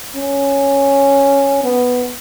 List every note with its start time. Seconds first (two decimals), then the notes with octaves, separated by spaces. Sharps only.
0.15 C#4
1.64 B3